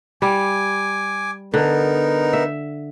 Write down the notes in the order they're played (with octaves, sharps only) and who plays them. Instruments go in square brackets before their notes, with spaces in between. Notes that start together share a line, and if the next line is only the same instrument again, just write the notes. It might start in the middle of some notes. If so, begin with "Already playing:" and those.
[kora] G3 [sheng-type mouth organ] G#5 D6
[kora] D3 [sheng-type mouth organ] B3 D#4 A#4
[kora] E5